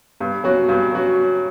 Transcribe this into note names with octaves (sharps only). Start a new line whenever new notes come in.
G2
F#3 C#4 F#4
G2
F#3 C#4 F#4